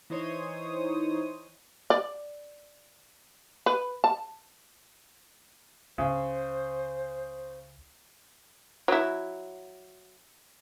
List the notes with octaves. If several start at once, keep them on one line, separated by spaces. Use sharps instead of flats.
E3 D#4 C5 C#5 D#6
D5
B4
A5
C#2 C#3 C5
F#3 E4